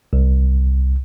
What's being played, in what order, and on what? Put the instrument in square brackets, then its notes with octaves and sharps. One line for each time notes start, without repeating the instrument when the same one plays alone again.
[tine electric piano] C2